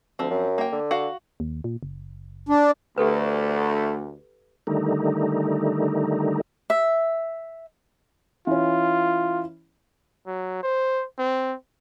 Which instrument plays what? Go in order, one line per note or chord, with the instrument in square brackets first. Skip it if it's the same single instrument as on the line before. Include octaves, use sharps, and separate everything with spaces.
[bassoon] D2 [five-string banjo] F3 C4
[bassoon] F#2
[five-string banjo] A#3 G5
[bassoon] D3
[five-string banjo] F#4 F5
[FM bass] D#2
A#2
F#1
[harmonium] D4
[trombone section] D2 [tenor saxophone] A3 [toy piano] G4 A4 B4
[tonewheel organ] D3 D#3 G3 A3 D#4
[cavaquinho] E5
[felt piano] E3 C#4 [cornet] F4
[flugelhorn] F#3
C5
C4